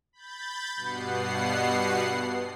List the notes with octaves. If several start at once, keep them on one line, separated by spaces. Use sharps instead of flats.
B5 G6 A6
G2 B2 B3 F#5 C7